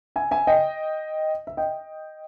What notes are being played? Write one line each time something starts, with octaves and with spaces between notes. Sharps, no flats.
E5 G#5
E5 G#5
D#5 G5
E5
D#5 G5